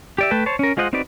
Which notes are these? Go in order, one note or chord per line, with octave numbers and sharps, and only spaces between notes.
G4 D5 E5
A3 B4 G5 A5
C5 C#5 A5
C#4 A#4
G#3 F4 C5 D#5 F#5
C4 D#4 F#4 B4 D5